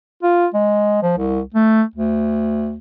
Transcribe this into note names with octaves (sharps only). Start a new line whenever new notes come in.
F4
G#3
F3
C2
A3
D2